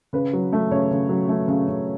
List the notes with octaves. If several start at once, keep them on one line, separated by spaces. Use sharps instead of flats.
C#3 B4
F#3
A3
C#3 C#5
C#3
F#3
A3
C#3
C#3